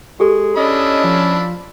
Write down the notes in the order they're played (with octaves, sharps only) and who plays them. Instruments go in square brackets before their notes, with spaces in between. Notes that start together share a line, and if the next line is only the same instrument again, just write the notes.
[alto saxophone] G#3 [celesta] G4 A4
[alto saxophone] C#4 [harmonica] D4 B5 E6 [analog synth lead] D#5
[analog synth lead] F3